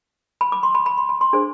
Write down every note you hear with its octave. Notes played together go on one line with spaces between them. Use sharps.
B5
D6
C6
B5
B5
C6
B5
C6
D4 G#4 C5